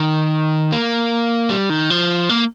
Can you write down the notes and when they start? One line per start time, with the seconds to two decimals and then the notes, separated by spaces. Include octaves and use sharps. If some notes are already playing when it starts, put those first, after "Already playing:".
Already playing: D#3
0.72 A#3
1.50 G3
1.70 D#3
1.90 F3
2.29 A#3